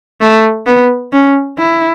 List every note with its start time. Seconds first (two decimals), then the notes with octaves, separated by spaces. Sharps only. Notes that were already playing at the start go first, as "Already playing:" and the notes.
0.21 A3
0.67 B3
1.13 C#4
1.59 E4